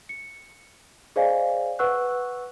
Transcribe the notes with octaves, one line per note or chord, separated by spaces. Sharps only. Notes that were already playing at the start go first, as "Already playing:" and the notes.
C#7
G#4 C5 D5 D#5 F5 G#5
B4 F#5 C#6 E6 F#6